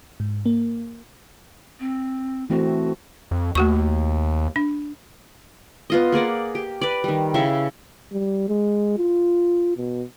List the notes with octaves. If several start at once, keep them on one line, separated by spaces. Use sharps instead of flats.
G#2
A#3
C4
E3 A3 C4 F#4
F2
D#2 A3 F#4 C#6
D4
B3 F4 D#5
A#3 G#4 D5 F#5
G4
B4 D5
D#3 G3
C#3 E4 E5
G3
G#3
F4
B2